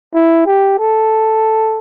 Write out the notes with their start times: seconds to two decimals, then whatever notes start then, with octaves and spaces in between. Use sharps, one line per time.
0.14 E4
0.46 G4
0.79 A4